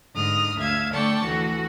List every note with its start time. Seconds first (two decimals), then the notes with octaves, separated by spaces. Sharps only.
0.15 G#2 D3 D#6 F6
0.58 D2 E5 F5 G#6
0.94 D3 A3 D5 G5 A5 C#6
1.26 D2 E3 F#4 A4